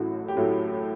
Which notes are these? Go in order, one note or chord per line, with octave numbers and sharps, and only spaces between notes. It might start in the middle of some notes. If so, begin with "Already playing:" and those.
Already playing: A1 A2 F#3 F#4
G4
A2 F#3 A3 F#4